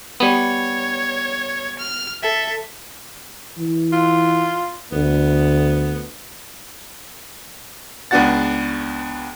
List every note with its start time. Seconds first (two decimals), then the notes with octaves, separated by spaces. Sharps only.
0.20 G3 B3 C#5
1.79 F6
2.22 A4 E5
3.58 E3
3.92 F4
4.92 D2 B3
8.11 C#2 B3 D4 F#4 F#5 A6